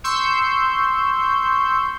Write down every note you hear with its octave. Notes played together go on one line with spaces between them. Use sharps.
C6 C#6 E6 G6